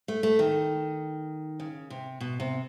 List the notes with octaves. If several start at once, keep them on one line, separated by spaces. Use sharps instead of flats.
A3
A3
D#3
C#3
C3
B2
C3